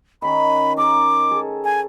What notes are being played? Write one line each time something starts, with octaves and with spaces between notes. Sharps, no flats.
D#3 C#4 B5
A#4 D6
G#4 A4
G#5